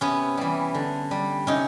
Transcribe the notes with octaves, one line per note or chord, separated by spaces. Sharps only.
C3 B3 C#4
E3 G3
D3
G3
C3 C#4 D#4